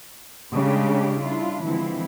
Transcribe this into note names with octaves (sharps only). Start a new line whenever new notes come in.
C#3 G#3 A3 C#4 D4 G4
G3 D4 E4 F4
D3 E3 F3 G#3 C4 E4